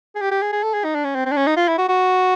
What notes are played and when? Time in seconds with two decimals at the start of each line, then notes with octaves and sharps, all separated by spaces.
0.15 G#4
0.21 G4
0.31 G4
0.42 G#4
0.52 G#4
0.63 A4
0.74 G#4
0.84 D#4
0.95 D4
1.04 C#4
1.15 C4
1.26 C4
1.32 D4
1.37 C#4
1.47 D#4
1.57 F4
1.68 E4
1.78 F#4
1.88 F#4